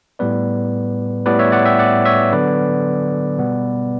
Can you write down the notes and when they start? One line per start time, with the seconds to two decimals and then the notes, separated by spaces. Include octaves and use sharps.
0.19 A2 G3 B3 B4 D5
1.26 A2 G3 B3 B4 D5
1.39 C#5 E5
1.52 D5 F#5
1.65 E5 G5
1.79 D5 F#5
2.05 C#5 E5
2.32 D3 F#3 B3 B4 D5
3.39 B2 G3 B3